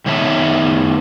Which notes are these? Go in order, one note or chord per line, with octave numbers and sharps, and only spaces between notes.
D#3 B3 C#5 E5 A5